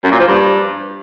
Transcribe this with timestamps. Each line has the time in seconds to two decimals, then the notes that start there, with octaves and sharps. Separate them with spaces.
0.04 F#2
0.12 A#2
0.20 F3
0.28 G2